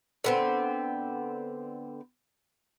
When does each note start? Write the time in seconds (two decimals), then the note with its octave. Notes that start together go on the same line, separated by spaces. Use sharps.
0.24 D3 B3 C4